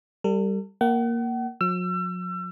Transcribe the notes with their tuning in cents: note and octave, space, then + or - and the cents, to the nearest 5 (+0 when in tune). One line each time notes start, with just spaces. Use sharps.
G3 +0 A4 +45
A#3 +0 F#5 +40
F#3 -45 E6 +35